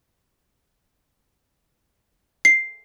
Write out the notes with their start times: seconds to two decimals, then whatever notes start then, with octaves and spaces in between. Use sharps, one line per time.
2.45 C7